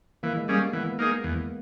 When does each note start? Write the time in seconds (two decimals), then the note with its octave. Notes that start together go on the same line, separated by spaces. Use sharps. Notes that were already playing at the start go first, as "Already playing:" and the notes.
0.23 E3 A#3
0.36 G#3
0.48 G3 A#3 C#4 G#4
0.61 B3
0.73 E3 B3
0.99 A#3 D#4 G#4
1.24 E2